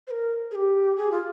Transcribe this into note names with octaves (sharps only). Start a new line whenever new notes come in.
C5
A#4
G#4
G4
G#4
F4